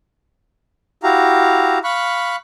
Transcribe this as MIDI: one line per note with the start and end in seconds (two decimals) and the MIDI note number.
1.03 1.79 64
1.03 1.79 66
1.03 1.79 67
1.03 1.79 77
1.03 1.79 82
1.84 2.36 77
1.84 2.36 83
1.84 2.36 85
1.84 2.36 90